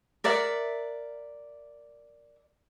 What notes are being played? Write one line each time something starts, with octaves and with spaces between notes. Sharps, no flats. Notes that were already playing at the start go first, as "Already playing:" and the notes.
A#4 D5 E5 F#5